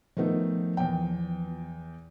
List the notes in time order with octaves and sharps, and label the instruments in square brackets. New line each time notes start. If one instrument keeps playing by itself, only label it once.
[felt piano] D#3 A3 D#4 [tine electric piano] F3 B3
[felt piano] E2 G5